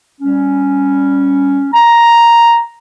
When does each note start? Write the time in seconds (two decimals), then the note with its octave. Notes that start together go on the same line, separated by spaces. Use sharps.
0.21 G3 C#4
1.74 A#5